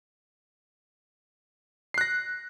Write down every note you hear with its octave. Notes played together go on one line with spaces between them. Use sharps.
F#6 A#6 C7